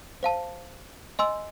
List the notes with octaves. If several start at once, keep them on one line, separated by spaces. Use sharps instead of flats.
C5 F5 A5
D#5 G#5 C6 E6